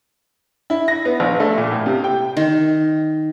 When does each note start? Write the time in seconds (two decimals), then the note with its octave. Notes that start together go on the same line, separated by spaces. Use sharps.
0.70 E4
0.88 A#6
1.05 B3
1.20 A#1
1.40 A3
1.58 A#2
1.71 A2
1.86 C3
2.04 G5
2.37 D#3